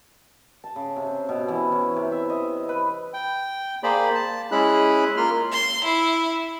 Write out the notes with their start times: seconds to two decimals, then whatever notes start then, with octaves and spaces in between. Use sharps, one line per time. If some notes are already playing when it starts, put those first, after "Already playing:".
0.64 A5
0.76 C#3
0.96 C3
1.29 B2
1.48 E3
1.72 C#4
1.97 C3
2.12 E5
2.30 D#5
2.69 B4
3.14 G5
3.83 A#3 G#4 C5 D5 B5
4.15 A5
4.52 G#3 C#4 E4 G#4 B5 F#6
5.17 A#3 F4 C6 F6
5.52 C6
5.84 E4